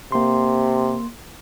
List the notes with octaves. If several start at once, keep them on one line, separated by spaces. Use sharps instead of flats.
C3 A#3 C6